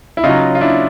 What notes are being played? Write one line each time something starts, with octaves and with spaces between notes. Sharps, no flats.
E4
C#3 F#3 D#4 F4
F4
D4 E4